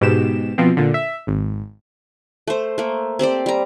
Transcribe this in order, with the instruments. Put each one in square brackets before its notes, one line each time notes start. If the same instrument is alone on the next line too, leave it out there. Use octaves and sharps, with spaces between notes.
[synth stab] G#2 B2 G4 E7
B2 F3 C4
A#2 D3
E5
G#1
[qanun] A3 C5
A3 A#3
C4 G4 C5 D5
G3 A#5